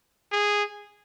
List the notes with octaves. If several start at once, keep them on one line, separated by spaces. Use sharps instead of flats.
G#4